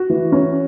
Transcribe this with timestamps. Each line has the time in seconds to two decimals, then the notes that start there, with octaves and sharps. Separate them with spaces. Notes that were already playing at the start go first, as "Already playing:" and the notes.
Already playing: F#4
0.10 E3
0.32 C#4